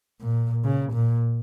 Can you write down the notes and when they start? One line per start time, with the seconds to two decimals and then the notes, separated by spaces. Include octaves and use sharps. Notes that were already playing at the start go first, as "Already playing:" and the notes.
0.21 A#2
0.64 C#3
0.93 A#2